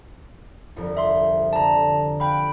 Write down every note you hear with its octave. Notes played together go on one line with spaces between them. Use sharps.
G1 C2 F2
E5 C6
D3 A5 A#5
F5 G5 B5 F#6